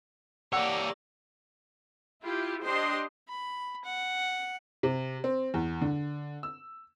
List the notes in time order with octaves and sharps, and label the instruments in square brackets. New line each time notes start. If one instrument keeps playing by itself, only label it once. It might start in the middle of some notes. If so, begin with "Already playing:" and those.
[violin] A#3 D5 [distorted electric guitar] G4 C#5 [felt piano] F#5 E6
[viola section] E4 F4 G4
D4 G4 C5 D#5 C6
[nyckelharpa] B5
F#5
[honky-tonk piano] C3
C4
E2
D3
E6